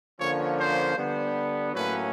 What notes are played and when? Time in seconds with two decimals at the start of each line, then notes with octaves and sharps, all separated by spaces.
0.20 D3 F3 A#3 C#4 C#5
0.58 C5
0.97 D3 G3 B3
1.73 A2 F#3 A#3 C#4 B4